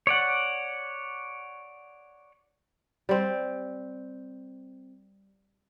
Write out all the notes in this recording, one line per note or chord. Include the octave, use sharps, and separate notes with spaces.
C#5 D5 F#5
G3 C4